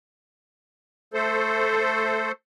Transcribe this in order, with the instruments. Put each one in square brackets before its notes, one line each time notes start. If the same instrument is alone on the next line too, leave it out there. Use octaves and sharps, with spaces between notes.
[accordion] A3 A4 C5